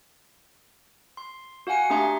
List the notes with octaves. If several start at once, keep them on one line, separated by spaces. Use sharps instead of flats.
C6
F#4 F5 F#5 G#5 C#7
A3 D4 G4 E5 A#5 C6